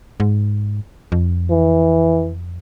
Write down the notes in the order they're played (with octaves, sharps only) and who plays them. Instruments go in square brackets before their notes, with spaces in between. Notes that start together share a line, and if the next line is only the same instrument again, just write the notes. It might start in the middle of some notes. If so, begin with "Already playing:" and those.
[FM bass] G#2
F2
[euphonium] E3